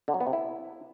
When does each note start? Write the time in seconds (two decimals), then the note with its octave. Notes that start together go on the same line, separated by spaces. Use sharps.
0.08 D3
0.14 F#3
0.20 B3
0.27 C3
0.33 E4